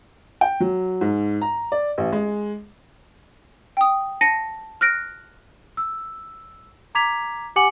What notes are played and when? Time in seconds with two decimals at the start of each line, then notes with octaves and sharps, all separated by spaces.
0.41 G5
0.60 F#3
1.01 G#2
1.41 A#5
1.72 D5
1.98 A1
2.12 G#3
3.77 G5 D#6
4.21 A5 A#6 C#7 D#7
4.81 F6 F#6 A#6 D7
5.77 E6
6.95 A#5 D6 G#6 B6 F7
7.56 G4 F#5 G#5 D6 C#7 F#7